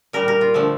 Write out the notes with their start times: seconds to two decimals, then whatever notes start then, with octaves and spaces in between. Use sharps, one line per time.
0.13 A#2 G3 A#4
0.28 A#4
0.41 F4
0.54 D3 F3 A3